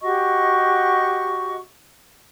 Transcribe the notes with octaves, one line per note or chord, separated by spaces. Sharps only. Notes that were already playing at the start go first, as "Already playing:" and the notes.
F#4 G4 D#5 C#6